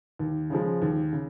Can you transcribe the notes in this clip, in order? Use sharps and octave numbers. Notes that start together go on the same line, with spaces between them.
D#2
C#3 F3 G#3
D#2
C#3